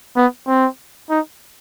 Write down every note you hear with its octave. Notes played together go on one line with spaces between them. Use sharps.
B3
C4
D#4